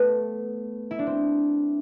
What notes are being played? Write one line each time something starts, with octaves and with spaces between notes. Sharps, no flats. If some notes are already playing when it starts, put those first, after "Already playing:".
Already playing: A3 B3
E4
D4
C4